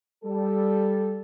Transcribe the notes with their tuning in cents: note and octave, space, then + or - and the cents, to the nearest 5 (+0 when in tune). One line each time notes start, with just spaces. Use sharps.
G3 +0 A4 -10